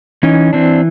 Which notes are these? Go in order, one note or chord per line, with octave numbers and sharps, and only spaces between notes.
E3 C#4 D#4
E3 C4 D4